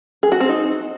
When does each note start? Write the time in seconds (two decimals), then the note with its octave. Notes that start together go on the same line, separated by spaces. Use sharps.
0.23 G#4
0.32 F#4
0.40 C4
0.49 D#4